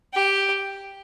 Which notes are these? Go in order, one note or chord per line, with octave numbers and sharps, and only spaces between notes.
G4